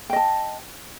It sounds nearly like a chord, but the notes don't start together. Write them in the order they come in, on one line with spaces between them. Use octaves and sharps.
G5 D#5 A5